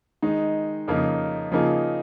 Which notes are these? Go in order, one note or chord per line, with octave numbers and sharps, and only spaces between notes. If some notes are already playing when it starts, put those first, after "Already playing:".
D#3 G#3 D#4
F2 C#3 A#3 D#4
C#3 F3 A#3 D#4 G#4